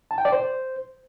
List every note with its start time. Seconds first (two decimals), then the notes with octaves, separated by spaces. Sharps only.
0.11 A5
0.18 G5
0.25 D5
0.32 C5